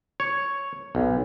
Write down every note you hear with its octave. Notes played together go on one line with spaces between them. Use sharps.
C#5
B1